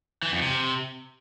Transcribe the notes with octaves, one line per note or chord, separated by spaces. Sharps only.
E3
F2
C3